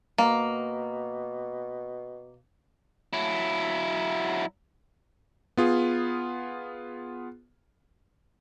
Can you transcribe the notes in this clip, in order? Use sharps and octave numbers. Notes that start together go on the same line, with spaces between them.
B2 A#3
F#3 E4
B3 F4 G#4